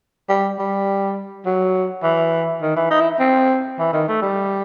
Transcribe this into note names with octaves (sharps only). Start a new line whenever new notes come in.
G3
G3
F#3
E3
D#3
E3
D#4
E4
C4
E3
D#3
A3
G3